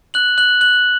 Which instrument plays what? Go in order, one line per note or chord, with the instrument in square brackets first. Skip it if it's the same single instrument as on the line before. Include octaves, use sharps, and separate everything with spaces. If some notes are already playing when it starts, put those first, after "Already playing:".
[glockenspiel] F#6 F#7
F#6 F#7
F#6 F#7